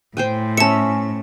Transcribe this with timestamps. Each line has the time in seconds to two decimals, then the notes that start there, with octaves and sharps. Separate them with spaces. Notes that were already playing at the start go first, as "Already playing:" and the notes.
0.17 A2 C5 G5 G#5
0.57 C#4 E5 A5 C#7